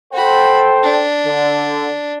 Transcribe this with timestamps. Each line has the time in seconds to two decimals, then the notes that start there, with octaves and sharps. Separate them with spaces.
0.13 F#4 A4 C5 G5 B5
0.83 D4
1.26 D3